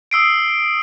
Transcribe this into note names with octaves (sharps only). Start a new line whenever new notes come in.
D#6 E6 C7 D7